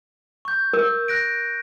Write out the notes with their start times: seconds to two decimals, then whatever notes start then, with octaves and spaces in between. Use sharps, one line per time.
0.45 C#6 G6
0.73 A#4
1.08 F#6 A#6 D7